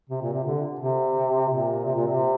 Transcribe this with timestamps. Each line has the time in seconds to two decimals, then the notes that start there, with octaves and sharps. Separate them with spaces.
0.10 C3
0.22 A#2
0.33 C3
0.44 D3
0.79 C3
1.49 A#2
1.85 C3
1.96 A#2
2.08 C3